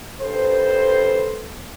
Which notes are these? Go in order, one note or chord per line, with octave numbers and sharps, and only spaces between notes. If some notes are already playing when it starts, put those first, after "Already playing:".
G2 A4 B4 C5